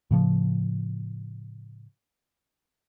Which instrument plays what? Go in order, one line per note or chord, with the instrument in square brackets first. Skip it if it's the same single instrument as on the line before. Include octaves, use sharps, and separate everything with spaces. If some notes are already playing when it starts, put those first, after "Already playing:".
[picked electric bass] A2 C#3 F3